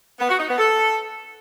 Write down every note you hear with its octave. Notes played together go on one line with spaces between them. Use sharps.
B3
F#4
D#4
B3
A4